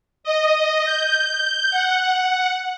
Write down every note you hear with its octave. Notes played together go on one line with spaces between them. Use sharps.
D#5
G6
F#5